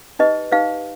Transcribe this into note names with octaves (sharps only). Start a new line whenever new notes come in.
D#4 G4 B4 D#5
D#4 G4 B4 F5